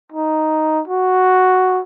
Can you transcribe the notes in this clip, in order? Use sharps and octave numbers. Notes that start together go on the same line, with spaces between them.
D#4
F#4